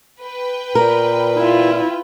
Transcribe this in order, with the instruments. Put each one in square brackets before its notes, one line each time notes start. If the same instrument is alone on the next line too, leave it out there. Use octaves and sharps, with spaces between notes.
[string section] B4 G5
[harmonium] A#2 [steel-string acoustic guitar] A#4
[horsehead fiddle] E4 F4